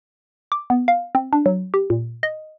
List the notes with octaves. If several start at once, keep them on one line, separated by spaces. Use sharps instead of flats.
D6
B3
F5
C4
D4
F#3
G4
A#2
D#5